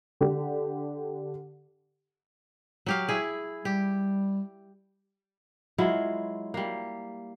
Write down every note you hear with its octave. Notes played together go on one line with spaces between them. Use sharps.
D3 G4
F#3 G4 F5
E4 G#4
G3 G4
F#3 G#3 E4 F4
G3 A#3